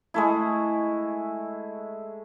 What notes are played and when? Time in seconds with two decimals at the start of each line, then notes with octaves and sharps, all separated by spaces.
0.14 G#3 A3 E4